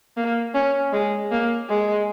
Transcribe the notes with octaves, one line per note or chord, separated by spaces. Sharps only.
A#3
C#4
G#3
A#3
G#3